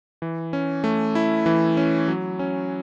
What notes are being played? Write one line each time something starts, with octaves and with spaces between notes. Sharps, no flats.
E3
C#4
A3
E4
E3
C#4
F#3
C#4